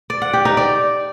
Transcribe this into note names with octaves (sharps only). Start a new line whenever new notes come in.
D5
F#5
G4
D#4
D5